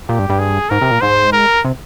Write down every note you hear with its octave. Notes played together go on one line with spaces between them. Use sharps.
A#2 G4
G2
G2
G#4
G#2 A#4
C3
A#2
G#2 C5
A#4
C3